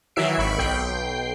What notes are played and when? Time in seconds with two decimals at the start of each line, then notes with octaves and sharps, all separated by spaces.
0.16 D#3 E3 F#3 E5 C7 D7
0.38 G#1 B5 C#6 B6 D7
0.58 B1 G5 C7